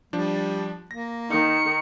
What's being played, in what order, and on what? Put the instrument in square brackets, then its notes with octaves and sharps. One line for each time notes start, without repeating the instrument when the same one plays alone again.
[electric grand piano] F3 D4 [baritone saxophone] G3
[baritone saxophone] A#3 [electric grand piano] A#6
[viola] D#3 [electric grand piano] D#4 [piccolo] C#7